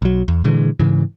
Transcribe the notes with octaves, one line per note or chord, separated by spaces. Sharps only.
B1 F#3
E2
A#2 D3 E3 G#3
G#2 C#3 E3